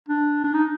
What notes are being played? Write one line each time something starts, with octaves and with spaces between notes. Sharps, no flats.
D4
D4
D#4